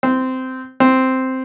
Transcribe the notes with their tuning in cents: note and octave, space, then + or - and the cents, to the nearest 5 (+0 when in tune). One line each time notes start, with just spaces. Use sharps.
C4 -15
C4 -5